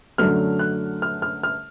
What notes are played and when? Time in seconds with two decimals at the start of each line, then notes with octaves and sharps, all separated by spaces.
0.18 F#2 D3 F#3 A3 F6
0.59 F#6
1.02 F6
1.22 F6
1.43 F6